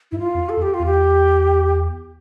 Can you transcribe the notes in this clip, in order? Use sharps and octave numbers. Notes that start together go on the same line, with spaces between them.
G2 E4
F4
F2
A4
F2
G4
F4
E2
G4